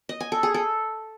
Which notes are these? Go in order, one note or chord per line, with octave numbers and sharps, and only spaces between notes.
D#5
G#5
A4
G#4
A4